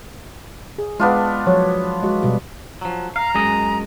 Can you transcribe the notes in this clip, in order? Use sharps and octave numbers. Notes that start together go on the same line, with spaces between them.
G#4
G#3 B3 D4 F4
F3 F#3 C#5
G#3 F#4
B2 G3 F#4
F3 F#3
F5 A#5
F#2 G#3 D#5